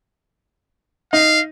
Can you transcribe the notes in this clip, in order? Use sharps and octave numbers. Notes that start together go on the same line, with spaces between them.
D#4 F5